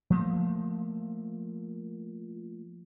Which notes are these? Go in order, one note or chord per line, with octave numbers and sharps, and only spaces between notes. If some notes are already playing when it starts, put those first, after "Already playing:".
F3 A3 A#3